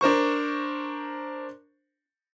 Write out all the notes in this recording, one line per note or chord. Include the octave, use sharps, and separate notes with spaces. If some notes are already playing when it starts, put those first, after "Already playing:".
D4 A#4 C5 C#6